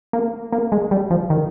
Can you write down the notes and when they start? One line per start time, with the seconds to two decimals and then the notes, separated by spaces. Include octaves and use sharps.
0.13 A#3
0.52 A#3
0.72 G#3
0.91 G3
1.11 F3
1.30 D#3